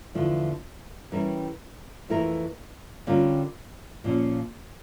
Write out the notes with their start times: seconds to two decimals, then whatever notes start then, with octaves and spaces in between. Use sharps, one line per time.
0.14 E2 D3 F3 A3 E4
1.12 E3 G3 C#4 E4 A#4
2.09 F2 E3 A3 E4 A#4
3.07 D3 G3 C#4 F4 A#4
4.04 A#2 F3 C#4